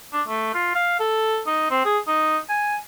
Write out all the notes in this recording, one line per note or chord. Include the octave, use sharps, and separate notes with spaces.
D4
A3
F4
F5
A4
D#4
C4
G#4
D#4
G#5